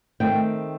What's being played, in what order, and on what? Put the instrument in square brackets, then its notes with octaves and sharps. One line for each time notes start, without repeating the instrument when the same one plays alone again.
[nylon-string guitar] D#3 A3 C4 G5